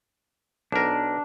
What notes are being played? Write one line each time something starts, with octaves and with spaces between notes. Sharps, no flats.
B1 D4 A#4